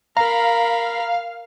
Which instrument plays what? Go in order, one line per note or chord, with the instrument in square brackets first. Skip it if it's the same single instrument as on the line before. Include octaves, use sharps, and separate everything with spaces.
[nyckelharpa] A#4 B5 [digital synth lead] F5 [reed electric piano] A#5